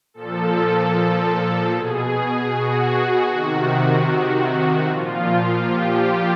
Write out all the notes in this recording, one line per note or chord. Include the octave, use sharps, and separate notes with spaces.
A#2 F3 A4
B2 G#4
F#4
C3 D#3
A#2 F3 F4
G4
G4